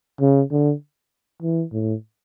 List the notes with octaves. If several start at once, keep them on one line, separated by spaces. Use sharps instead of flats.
C#3
D3
E3
A2